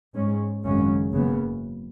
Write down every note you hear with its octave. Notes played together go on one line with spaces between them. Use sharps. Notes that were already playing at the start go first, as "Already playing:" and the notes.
G#2 G#3 C#4
G#1 F#2 C#3 G#3 C#4
F#1 F#2 C#3 B3